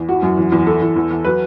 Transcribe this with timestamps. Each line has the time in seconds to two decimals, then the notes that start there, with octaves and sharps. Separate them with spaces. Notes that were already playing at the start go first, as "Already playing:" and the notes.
Already playing: E2
0.09 E3 F#4
0.23 F#2
0.37 E2
0.52 E2
0.67 E3 A4
0.82 E2
0.96 E2
1.10 E2
1.25 F#3 B4